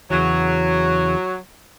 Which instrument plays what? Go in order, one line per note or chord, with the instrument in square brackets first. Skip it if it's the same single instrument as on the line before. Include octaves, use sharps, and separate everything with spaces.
[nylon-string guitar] E2 C#3 E3 [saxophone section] F#3